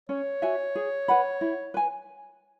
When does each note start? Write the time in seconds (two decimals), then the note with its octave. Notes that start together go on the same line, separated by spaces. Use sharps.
0.09 C#4 C#5
0.42 F#4 E5 G#5
0.75 G#4
1.08 B4 F#5 B5
1.41 E4
1.74 B4 G#5